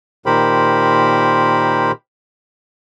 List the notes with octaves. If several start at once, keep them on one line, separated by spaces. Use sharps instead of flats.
A#2 D#3 G4 A#4 C5 B5